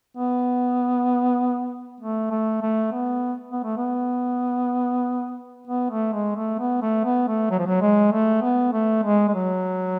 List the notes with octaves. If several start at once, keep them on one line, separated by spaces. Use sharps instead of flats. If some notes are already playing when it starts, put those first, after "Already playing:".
B3
A3
A3
A3
B3
B3
A3
B3
B3
A3
G#3
A3
B3
A3
B3
A3
F#3
F3
F#3
G#3
A3
B3
A3
G#3
G#3
F#3